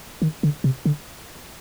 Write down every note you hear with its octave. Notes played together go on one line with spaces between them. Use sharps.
D#3
D3
C3
D3